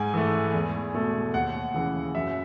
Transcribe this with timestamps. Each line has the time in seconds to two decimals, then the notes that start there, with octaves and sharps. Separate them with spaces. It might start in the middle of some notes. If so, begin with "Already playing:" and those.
Already playing: G#2 G#5
0.14 E3 A3
0.54 E2
0.94 B2 A3
1.34 D#2 F#5
1.74 C#3 E3
2.15 F#2 E5